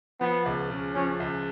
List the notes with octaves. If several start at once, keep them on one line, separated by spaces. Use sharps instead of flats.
F3 B3
C#2
C#3
F3 C#4
C#2